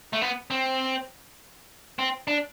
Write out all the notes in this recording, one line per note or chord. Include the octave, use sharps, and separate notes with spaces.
A3
B3
C4
C4
D4